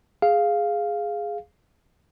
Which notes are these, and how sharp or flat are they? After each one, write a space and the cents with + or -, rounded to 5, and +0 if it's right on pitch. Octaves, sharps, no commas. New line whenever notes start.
G#4 +0 F5 +0